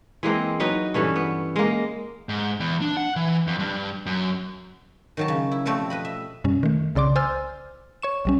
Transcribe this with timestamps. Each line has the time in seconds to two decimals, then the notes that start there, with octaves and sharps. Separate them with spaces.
0.23 E3 G#3 A#3 C4
0.60 F#3 D#4 B4
0.94 G2 E3 C#4 A4
1.16 B3
1.56 G#3 A#3
2.29 G#2
2.60 E2
2.81 D4
2.97 F#5
3.16 E3
3.47 F2
3.59 G2
4.06 F#2
5.17 D#3 F#3 A5
5.28 C#3
5.51 E4
5.66 B2 F3 G3 A3 C4
5.90 B4 D#5 B5
6.05 E5
6.44 F#2 B2 G3 C#4
6.63 D#3 A3
6.95 C2 C#3 D5 C6 D6
7.16 C5 G#5 C6 E6 F6 A6
8.02 C#5 C#6 E7
8.25 B1 G3 C#4